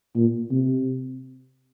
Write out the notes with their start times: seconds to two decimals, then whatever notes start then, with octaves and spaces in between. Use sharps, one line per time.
0.16 A#2
0.51 C3